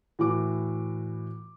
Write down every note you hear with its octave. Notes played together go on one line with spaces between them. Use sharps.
A2 E3 F#4 D6